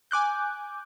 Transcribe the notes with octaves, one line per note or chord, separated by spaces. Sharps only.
G#5 D6 F#6 G6